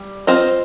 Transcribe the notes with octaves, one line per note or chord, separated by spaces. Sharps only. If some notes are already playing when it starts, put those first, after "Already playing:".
Already playing: G3
C4 F4 C5 D#5